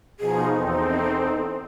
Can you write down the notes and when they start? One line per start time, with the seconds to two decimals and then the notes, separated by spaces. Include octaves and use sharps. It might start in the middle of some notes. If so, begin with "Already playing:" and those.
0.20 B2 F3 D#4 G#4
0.53 E2 C4 D#4 A4